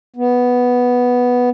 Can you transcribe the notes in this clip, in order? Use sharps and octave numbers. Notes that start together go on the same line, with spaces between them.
B3